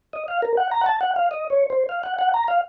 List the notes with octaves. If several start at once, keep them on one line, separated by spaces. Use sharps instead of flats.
D#5
F5
A#4
F#5
A#5
F#5
A5
F#5
F5
D#5
C#5
C5
F5
F#5
F#5
A#5
F5